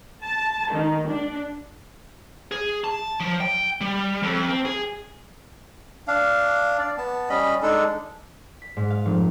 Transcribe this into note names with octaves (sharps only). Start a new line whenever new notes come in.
A5
D#3
D4
G#4
A5
F3
G5
G3
F2
C4
G#4
D4 F5
D5
B3 A5
G3 C#4 D#5 B5
G#3 D4 D#4 A4
B6
G#2
F5
F1